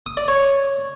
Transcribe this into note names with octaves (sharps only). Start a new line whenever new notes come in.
D#6
D5
C#5